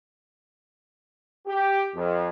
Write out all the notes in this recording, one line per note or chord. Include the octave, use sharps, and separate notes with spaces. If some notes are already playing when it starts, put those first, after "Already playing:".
G4
F2